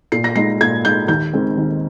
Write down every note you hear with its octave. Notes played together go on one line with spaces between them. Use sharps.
A#2 C7
A#6
G#3 D#4 C7
A#2 G#6
G#3 D#4 G6
D#2 G6
D#3 G#3 C4
D#2